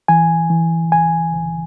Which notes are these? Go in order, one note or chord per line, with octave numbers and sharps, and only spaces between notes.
E3 G#5
E3
C#2 G#5
C#2